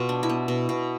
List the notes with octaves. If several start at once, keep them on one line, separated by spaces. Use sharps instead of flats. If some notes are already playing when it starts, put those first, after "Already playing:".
Already playing: B2 F4
D4
E4
B3
B2
B2